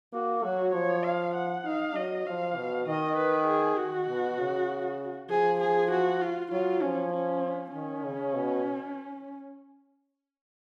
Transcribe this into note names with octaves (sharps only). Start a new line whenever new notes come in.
A#3 F#4
F#3 F#4
F3 C#5
F5
F#5
D#4 F5
F#3 D#5
F3 F5
B2
D#3 D#5
B4
G#4
F#4
B2
C#3
F3 G#4
G#4
F#4
F4
F#3 F4
F3 C#4
C#4
D#3 C#4
C#3
B2